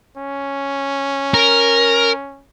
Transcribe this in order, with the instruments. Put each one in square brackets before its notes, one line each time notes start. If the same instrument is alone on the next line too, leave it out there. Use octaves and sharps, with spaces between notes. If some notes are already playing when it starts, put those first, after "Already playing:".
[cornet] C#4
[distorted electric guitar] A#4